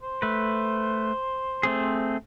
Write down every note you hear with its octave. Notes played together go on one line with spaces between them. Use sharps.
C5
A3 B4
A3 C4 G#4